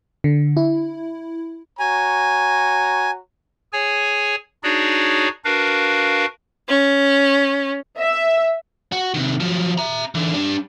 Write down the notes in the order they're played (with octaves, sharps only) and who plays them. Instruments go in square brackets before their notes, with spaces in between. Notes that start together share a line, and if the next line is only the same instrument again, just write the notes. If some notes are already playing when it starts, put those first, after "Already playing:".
[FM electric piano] D3
E4
[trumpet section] F#4 C#5 A#5 [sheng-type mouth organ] G#5
[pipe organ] G#4 C#5 G#5
D4 D#4 F#4 G#4 C#5 D5
D4 F#4 A#4 B4 F5
[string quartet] C#4
[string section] E5
[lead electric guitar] F#4
C3 D#3
F3 F#3
E5 A#5
D3 E3
G3 D4